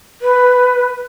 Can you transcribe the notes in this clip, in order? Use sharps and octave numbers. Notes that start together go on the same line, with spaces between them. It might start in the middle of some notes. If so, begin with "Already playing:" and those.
B4